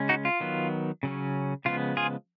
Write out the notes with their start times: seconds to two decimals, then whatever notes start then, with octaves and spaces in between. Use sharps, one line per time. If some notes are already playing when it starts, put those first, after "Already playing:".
Already playing: C#3 G#3 C#4
0.09 D#4 F#4
0.25 F4
0.40 D#3 F#3 B3
1.03 C#3 F#3 C#4
1.65 C#3 F3 G#3 B3 F4
1.97 F4 G#4